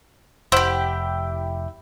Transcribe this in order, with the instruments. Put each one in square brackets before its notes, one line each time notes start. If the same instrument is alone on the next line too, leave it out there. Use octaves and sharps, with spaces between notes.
[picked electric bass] F1 [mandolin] E4 G4 [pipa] C5 F#5